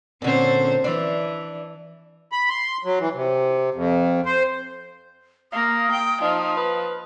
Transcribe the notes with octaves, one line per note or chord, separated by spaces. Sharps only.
A#2 D3 C4 C#4 C5
E3 D4 D5 E5
B5
C6
F#3
E3
C3
F2
C5
A#3 F5 D#6
G5
F3 D#4
B4